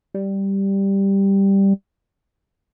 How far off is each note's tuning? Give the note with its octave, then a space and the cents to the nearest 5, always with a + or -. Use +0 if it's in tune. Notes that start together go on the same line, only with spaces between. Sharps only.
G3 +0